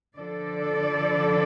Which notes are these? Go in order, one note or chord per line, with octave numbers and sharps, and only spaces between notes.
D3 F3 D4 A4 D5